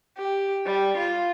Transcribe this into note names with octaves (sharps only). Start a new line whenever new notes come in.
G4
G3
F4